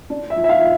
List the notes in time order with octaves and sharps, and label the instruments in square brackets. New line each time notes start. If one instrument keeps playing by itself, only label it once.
[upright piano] D4
E5
F3
E5
F5